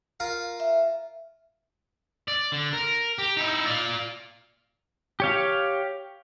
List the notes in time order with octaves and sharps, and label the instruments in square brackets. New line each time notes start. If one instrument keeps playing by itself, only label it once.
[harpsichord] F4 A#4 F5
[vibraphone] E5
[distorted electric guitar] D5
D3
A#4
G4
D#4 E4
F4 D5
[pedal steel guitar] G4 C#5 F5